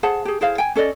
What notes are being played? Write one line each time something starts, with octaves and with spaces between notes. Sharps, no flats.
G#4 C5 F#5 A5
G4 G#4
E4 G#4 C5 F5
G5 G#5
C#4 A4 D5 D#5